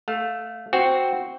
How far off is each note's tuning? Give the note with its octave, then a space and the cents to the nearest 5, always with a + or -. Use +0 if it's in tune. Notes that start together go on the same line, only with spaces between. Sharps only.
A3 +0 F5 +20
C4 +0 F#4 +0